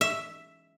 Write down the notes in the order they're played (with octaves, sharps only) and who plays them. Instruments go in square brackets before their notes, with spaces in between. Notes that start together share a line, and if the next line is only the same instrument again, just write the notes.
[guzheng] E5